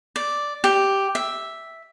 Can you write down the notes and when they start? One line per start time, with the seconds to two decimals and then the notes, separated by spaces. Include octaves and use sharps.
0.16 D5
0.64 G4
1.15 E5